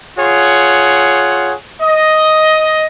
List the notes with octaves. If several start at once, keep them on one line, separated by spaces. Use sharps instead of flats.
F4 G#4 C#5 F#5
D#5